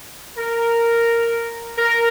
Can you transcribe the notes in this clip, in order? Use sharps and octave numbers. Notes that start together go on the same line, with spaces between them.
A#4
A#4